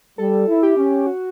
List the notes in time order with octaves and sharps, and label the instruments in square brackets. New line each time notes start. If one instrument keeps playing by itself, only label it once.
[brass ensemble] G3 [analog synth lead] A4
[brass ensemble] E4
[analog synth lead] G4
[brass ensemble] C#4
[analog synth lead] F#4